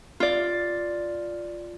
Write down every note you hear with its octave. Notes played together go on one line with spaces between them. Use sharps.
F4 D5